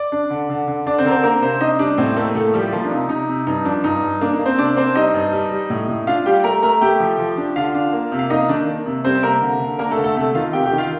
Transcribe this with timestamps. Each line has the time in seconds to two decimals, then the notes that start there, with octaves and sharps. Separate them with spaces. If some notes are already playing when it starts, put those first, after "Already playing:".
Already playing: D5
0.12 D4
0.30 D3
0.50 D3
0.68 D3
0.86 D3 D4 D5
0.98 C4 C5
1.05 D3 A#4
1.11 C4 C5
1.23 A#3 D4 A#4
1.42 C3 C4 C5
1.61 D4 D#4 D#5
1.79 G3 D4 D5
1.98 A2 C4 C5
2.16 A3 A#3 A4
2.35 A2 A3 A4
2.54 F3 G3 G4
2.72 F3 A#3 F4
2.84 D4
2.91 C3 D#4
3.09 C3 D#4
3.28 C3
3.47 G2 D#4
3.65 F3 D4
3.84 G2 D#4
4.02 G2
4.21 A#3 D4
4.33 D#4
4.39 A#3
4.46 C4 C5
4.58 C3 D4 D5
4.77 C4 D4 C5
4.95 G3 D#4 D#5
5.14 G2
5.33 G3
5.51 G3
5.70 A2
5.89 A2
6.07 D4 F4 F5
6.26 G3 G4 G5
6.44 A3 A#4 A#5
6.63 A3 A#4 A#5
6.81 A3 G4 G5
7.00 F3
7.19 F3
7.37 D4
7.56 D3 F4 F5
7.74 D4
7.93 A#3
8.12 C3
8.19 F5
8.30 A#3 D#4 D#5
8.49 D#3 D4 D5
8.67 A#3
8.86 C3
9.04 G3 C4 C5
9.23 C3 A#3 A#4
9.42 D3
9.60 D3
9.79 A#3 D4 A#4
9.91 A3 A4
9.98 D3
10.04 A3 A4
10.16 C3 A3 A4
10.35 D#3 F4 F5
10.53 C3 G4 G5
10.66 G4 G5
10.72 D#3
10.78 F4 F5